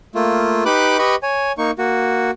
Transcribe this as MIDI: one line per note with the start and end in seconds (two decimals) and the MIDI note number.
0.15 0.64 57
0.15 0.64 58
0.15 0.64 65
0.66 0.98 63
0.66 0.98 67
0.66 0.98 71
0.66 0.98 83
0.66 0.98 86
0.66 0.98 90
0.98 1.15 67
0.98 1.15 71
0.98 1.15 75
0.98 1.15 83
0.98 1.15 85
1.23 1.52 73
1.23 1.52 80
1.58 1.71 58
1.58 1.71 63
1.58 1.71 85
1.78 2.31 58
1.78 2.31 66